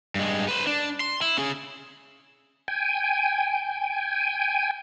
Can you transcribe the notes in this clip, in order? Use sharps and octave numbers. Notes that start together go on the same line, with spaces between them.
G2 G#3
B4 C5
D4
C6
E4
C#4 G#4
G5 G#5